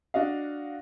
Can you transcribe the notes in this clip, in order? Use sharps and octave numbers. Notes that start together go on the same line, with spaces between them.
D4 F#4 D#5 F5